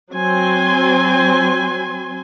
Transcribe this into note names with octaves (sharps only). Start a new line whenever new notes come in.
F#3 C4 G#5 C6